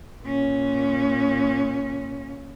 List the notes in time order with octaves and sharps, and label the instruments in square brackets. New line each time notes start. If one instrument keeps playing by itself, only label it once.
[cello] A#2 C#4